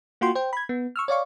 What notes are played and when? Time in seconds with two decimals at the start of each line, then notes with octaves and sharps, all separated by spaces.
0.21 A#3 F4 F#4 G5 C6
0.35 C5 G5
0.53 B5 G#6
0.69 B3
0.96 C#6 E6 F6
1.08 C#5 D5 F5 C#6